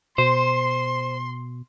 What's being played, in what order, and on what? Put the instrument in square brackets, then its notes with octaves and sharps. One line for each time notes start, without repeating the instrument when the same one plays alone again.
[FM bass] B2 [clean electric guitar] C5 [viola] C6